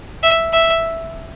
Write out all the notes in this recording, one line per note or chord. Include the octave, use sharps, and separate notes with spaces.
E5
E5